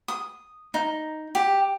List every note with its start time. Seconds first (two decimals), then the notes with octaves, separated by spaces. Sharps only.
0.08 D#6
0.74 D#4
1.35 G4